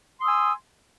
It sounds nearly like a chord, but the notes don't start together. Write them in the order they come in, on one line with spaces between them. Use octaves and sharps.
C6 D#6 E6 G#5